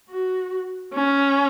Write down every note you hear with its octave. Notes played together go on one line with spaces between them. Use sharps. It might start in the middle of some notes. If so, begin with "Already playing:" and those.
F#4
C#4